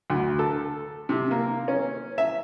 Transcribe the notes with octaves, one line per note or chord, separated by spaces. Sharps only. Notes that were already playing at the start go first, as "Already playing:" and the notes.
D2
A4
C3
A#3
C#4
E5